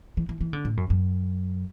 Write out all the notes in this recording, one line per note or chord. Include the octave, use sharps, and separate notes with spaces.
E3
E3
E3
D3
A2
F#2
F#2